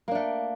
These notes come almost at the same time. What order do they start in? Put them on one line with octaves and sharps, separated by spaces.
A#3 D4 A3